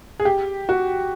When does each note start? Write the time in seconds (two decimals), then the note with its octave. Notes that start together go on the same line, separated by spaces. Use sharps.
0.20 G#4
0.25 G4
0.69 F#4